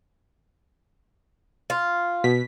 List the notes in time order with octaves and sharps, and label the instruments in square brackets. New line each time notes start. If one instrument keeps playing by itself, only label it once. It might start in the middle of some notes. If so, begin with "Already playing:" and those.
[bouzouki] F4
[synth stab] B2 B6